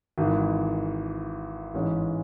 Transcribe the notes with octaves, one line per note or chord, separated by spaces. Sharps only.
G#1 G#2 E3
A1 G#2 E3 G#3 C#4